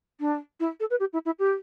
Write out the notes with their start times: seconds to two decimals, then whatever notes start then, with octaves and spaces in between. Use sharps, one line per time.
0.20 D4
0.60 E4
0.80 A4
0.90 B4
1.00 G4
1.13 E4
1.26 E4
1.39 G4